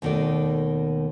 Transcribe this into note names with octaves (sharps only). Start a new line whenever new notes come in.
D#2 B2 D#3 A3 D5